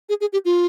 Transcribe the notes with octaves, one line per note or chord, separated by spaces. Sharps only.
G#4
G#4
G4
F4